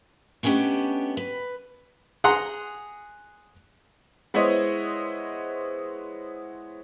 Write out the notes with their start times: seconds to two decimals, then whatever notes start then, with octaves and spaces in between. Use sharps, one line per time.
0.43 A3 B3 C#4 D4 G4 D#5
1.17 B4
2.24 G#4 F#5 A#5 C6
4.34 G#3 B3 E4 C5 C#5 D#5